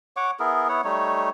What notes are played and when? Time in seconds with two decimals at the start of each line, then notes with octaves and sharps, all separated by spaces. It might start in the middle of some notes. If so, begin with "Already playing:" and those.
0.17 C#5 F#5 C#6 D6
0.40 B3 E4 G#4 A#4
0.69 B3 E4 C#5 F#5
0.84 G3 A3 D#4 C#5